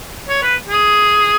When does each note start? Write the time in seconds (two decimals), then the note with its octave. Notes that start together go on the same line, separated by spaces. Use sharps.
0.29 C#5
0.43 B4
0.69 G#4